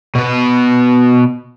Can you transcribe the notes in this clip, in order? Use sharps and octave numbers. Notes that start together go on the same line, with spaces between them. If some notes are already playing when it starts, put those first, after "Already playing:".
B2 B3